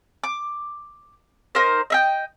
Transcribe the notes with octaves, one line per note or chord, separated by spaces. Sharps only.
D6
D#4 A#4 C5
D#5 E5 G5